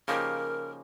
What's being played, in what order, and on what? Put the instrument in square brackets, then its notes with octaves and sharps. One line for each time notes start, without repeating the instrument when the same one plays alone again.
[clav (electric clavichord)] C#3 F3 A#3 D#4 G4 [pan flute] A#4